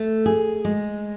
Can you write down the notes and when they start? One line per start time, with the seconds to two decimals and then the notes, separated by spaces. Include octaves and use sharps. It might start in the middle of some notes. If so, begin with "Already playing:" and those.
Already playing: A3
0.26 G#4
0.65 G#3